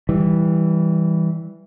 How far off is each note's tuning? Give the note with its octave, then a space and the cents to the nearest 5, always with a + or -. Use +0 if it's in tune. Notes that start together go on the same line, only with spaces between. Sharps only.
E3 -10 G3 +0